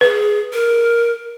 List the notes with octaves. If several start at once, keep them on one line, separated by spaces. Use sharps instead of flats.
G#4 B4
A#4